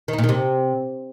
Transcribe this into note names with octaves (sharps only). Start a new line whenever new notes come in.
D#3
D#4
A#2
D#3
C3